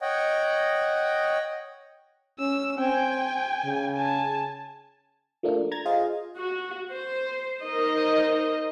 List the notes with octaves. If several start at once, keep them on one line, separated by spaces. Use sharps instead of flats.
C#5 D#5 F#5 G5
C#4 E6
C4 G5 G#5
C#3
G#5 A5
F3 A3 A#3 D4
A#5 G#6 A6
F4 G#4 C5 D#5 F5
F#4
C5
D#4 A#4 C5 D#5